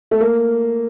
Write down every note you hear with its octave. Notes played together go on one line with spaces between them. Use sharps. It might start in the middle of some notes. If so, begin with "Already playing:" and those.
A3
A#3